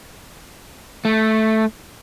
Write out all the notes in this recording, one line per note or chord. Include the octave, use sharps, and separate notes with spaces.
A3